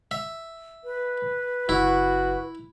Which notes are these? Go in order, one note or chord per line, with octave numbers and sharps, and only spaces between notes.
E5
B4
F#1 E4 F#4